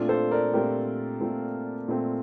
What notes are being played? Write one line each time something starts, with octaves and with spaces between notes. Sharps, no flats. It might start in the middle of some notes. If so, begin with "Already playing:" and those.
Already playing: A#2 A3 C4 D4 F4
A4 C5
A#4 D5
A#2 A3 C4 G4 A#4
A#2 A3 C4
A#2 A3 C4